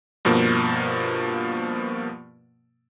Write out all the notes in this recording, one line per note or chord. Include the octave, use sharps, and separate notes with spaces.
G2 B2 F3 A#3